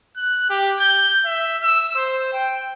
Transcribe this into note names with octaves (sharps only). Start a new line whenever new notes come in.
F#6
G4
G6
E5
E6
C5
G5